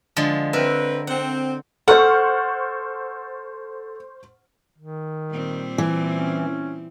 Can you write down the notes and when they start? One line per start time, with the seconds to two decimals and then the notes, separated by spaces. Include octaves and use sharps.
0.17 D3 F3 G#3
0.53 C4 A#4 B4 E5
1.07 C4 F#5
1.88 A4 C5 F#5 C#6 F6
4.78 D#3
5.30 A#2 G3 C4
5.78 E3
6.15 C#4